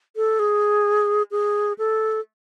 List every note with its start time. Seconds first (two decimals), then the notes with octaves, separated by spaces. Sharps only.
0.16 A4
0.39 G#4
1.31 G#4
1.78 A4